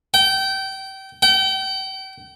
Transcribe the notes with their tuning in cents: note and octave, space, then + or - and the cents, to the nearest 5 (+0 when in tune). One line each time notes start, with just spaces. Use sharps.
G5 -25
G5 -35